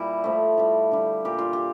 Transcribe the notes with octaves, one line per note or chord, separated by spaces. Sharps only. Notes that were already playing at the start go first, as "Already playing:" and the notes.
Already playing: A#2 G3 E4
A2 F3 A3
A2 G3
D3 G3
A#2 G3 G4
F4
G4